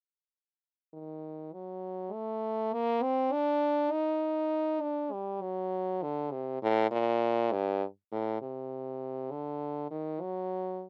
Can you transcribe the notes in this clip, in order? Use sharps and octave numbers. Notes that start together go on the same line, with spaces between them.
D#3
F#3
A3
A#3
C4
D4
D#4
D4
G3
F#3
D3
C3
A2
A#2
G2
A2
C3
D3
D#3
F#3